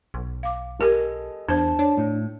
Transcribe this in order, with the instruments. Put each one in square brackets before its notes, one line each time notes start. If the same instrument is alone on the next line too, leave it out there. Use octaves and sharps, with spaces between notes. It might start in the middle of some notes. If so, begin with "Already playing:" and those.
[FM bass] B1
[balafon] F5 D6
[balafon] G4 A#4 [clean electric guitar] A4 D#5 G#5
[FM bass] E2 [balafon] D4 C5 [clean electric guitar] A5
[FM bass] D4 [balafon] C#5
[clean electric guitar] A2